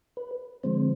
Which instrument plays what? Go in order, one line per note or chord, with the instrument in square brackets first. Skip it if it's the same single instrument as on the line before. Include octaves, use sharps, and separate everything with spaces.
[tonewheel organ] B4
D3 F3 G#3 C4 C5